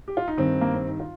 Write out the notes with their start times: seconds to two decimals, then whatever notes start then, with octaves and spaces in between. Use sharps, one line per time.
0.08 G4
0.17 F4
0.28 D#4
0.37 G2 D#3 C4
0.61 A#3
0.74 C4
0.87 D#4
1.00 F4